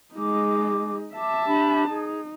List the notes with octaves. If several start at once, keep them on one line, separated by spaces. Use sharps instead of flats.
G#3 D#4 D6
E5 A5 D6
D4 G4 B5
D#4 G#4